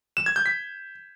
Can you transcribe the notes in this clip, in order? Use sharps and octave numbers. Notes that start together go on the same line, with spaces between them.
E7
G#6
G6
B6